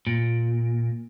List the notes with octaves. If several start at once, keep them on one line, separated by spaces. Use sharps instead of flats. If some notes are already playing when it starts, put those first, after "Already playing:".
A#2